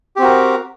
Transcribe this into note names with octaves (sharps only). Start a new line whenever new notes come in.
C4 F#4 G4 A#4